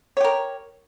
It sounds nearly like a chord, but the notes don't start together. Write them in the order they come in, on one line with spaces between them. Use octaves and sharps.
C#5 G4 A#4